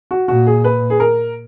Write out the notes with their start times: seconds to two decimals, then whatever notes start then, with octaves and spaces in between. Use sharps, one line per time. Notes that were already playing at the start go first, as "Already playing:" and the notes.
0.11 F#4
0.28 A#2 F#4
0.46 G#4
0.64 B4
0.90 G#4
1.00 A#4